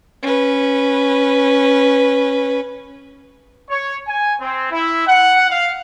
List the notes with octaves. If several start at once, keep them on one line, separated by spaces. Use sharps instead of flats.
C#4 B4
C#5
G#5
C4
E4
F#5
F5